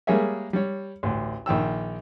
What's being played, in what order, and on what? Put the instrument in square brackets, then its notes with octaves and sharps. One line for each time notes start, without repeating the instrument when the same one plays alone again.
[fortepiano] G3 G#3 A#3 G#4 C#5 E5
G3 C#5
A1 D2
A#1 D#3 G5 E6